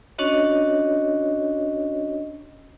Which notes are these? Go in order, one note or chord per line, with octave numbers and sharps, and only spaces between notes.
C#4 D4 F#4 C#5 D#5